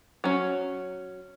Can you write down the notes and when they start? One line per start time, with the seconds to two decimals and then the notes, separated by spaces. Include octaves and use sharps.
0.24 F#3 C#4